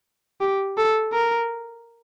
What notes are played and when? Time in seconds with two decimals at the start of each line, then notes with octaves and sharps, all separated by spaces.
0.41 G4
0.78 A4
1.13 A#4